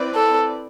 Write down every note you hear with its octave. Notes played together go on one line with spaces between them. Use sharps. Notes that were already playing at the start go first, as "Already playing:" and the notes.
Already playing: C4 E4 B4 D5
A4